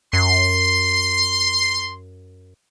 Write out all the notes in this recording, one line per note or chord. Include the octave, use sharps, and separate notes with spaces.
F#2 C6